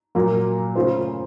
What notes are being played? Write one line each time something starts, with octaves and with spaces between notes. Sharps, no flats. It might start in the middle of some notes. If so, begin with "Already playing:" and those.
A#2 F#3 A#3
C#3 A3 C#4 F4 C5